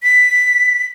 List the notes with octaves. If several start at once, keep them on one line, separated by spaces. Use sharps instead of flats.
B6